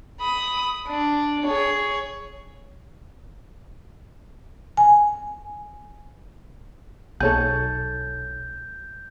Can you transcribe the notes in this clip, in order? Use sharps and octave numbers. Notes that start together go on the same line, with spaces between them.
B5 D#6
D4
G#4 C#5
G#5
B1 A4 C#5 G#5 G6